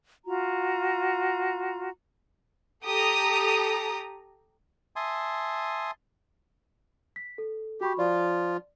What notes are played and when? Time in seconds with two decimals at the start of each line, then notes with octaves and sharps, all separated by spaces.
0.25 F4 F#4 A#5
2.85 G4 A4 A#5 D#6
4.96 E5 G#5 A5 C6 D#6
7.16 B6
7.38 A4
7.81 F#4 G4 B5 C#6
7.99 F3 F4 D5